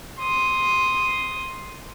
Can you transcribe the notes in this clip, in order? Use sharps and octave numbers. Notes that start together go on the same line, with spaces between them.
C6 D#6